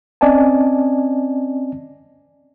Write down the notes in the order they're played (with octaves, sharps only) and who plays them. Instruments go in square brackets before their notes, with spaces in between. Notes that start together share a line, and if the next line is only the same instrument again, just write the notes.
[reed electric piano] C4 C#4 D5 D#5 G#5 A5